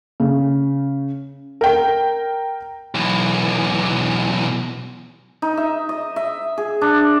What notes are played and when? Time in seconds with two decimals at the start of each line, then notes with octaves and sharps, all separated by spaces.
0.20 C#3
1.61 A#4 G5
2.95 B1 E3
5.42 D#4
5.57 E5
5.89 D#5
6.16 E5
6.58 G#4
6.81 D4